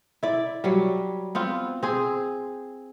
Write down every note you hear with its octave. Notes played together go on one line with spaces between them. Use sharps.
E4 D5
F#3 G3
B3 C4 F4
C4 G#4